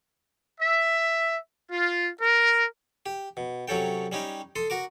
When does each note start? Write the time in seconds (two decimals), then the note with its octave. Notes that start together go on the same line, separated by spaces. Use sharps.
0.60 E5
1.71 F4
2.22 A#4
3.06 G4
3.37 B2
3.68 C3 F#3 C#4 A4 G5
4.12 G3 C#4 D#4 G4
4.56 A4 C6 D#6
4.70 F#4 A#4 D6